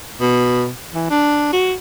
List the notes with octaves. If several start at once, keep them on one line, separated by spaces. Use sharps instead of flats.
B2
E3
D4
F#4